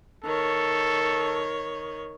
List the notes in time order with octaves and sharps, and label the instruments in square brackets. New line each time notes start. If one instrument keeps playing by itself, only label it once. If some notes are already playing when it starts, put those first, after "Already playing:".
[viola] D#3 C#5 [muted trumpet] A4